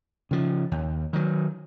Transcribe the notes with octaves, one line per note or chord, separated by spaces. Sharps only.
C#3 F3
D#2
D#3 F#3